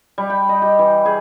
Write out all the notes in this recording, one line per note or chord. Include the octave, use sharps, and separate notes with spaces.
G3
G5
D#5
G4
E3
G#4